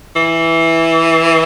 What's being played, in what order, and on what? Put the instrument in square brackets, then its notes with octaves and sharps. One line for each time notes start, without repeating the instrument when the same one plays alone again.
[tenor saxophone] E3